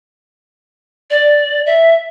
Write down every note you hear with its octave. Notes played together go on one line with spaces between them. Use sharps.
D5
E5